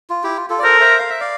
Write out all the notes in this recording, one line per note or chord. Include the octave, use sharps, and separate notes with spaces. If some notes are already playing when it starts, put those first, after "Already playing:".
F4
E4 G4
F4
F4 A4
D5
A4 A#4 C5
C5 E5
F5
E5
D5 F5